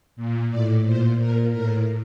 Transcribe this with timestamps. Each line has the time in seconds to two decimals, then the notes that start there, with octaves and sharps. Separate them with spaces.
0.16 A#2
0.50 A2 D5
0.85 A#2 C5
1.19 A#2 A#4
1.53 A2 A#4